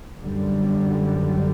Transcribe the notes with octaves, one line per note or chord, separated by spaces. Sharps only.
F#2 D3 G3